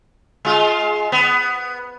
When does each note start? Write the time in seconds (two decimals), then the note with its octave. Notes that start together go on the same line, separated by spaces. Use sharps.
0.45 G#3 F4
1.12 B3